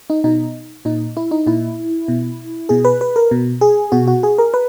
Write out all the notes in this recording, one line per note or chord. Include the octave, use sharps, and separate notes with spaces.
D#4
B2 D#4
A#2 D#4
E4
D#4
A#2 E4
B2
B2 G#4
B4
B4
A#4
B2
G#4
B2 F#4
F#4
G#4
A#4
B4